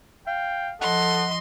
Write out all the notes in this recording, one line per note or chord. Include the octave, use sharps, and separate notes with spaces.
F5 G5
F3 A4 D#5 F#5 C6